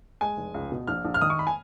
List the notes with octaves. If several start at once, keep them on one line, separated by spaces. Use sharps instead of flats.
G#3 G#5
F1
C#2
B2
A#1 F6
A#1
F6
D#3 D#6
C#6
B5
G#5